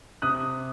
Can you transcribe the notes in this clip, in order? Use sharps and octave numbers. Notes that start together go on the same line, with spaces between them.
C3 D#6 F#6